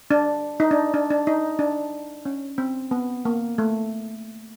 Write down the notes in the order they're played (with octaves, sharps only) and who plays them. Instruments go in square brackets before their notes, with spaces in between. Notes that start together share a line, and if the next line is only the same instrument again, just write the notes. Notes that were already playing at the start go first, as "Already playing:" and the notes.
[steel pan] D4
D#4
D4
D4
D4
D#4
D4
C#4
C4
B3
A#3
A3